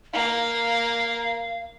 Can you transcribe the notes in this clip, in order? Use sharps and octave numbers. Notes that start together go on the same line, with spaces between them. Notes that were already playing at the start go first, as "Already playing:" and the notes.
A#3 F5